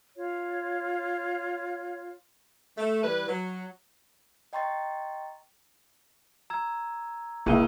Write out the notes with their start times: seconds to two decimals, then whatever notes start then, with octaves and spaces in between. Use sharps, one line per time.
0.17 F4 C#5
2.78 A3
3.03 E3 G3 B4
3.29 F#3
4.53 D#5 G5 A#5 C6 C#6 A6
6.50 A#5 E6 G#6
7.46 G1 C#2 A#3 E4 G#4 C#6 D#7 G7